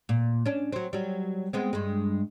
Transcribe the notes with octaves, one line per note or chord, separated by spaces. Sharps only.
A#2
C#4 D4
F#3 C4
F#3 G3
G#3 B3 C4
G2 G#3